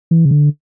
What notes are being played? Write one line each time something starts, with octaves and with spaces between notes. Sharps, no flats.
E3
C#3
D3